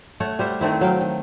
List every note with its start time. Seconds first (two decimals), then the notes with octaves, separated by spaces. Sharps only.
0.20 A3 C#5 F#5
0.39 G3 C5 E5 F#5
0.61 D#3 A3 C4 E4
0.81 F#3 F5 G5
1.01 D#3